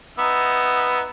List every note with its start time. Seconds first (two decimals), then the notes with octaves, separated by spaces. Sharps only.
0.18 B3 D#4 E5